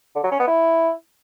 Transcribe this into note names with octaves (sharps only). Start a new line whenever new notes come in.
D3
F#3
C#4
B3
E4